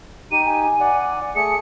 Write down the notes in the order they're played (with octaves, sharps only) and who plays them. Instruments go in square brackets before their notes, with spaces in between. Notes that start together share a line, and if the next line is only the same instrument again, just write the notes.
[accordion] D#4 G4 [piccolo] D#7
[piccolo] G#5
[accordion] D5 F#5
[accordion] A3 G#4 [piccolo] C#7